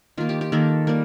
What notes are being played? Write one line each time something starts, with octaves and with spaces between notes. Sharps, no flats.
D#3 A#3 F4
G4
G4
D#3 A#3 A4
G3 A#3